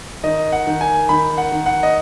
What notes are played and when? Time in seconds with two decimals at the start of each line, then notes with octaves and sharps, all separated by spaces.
0.24 D#3 D#5
0.52 F#5
0.67 D#3
0.81 G#5
1.09 D#3 B5
1.38 F#5
1.52 D#3
1.66 F#5
1.83 D#5